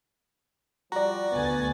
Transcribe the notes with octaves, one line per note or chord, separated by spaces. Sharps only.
F3 G3 F#4 D5 A#5
D2 B3 G#5 A6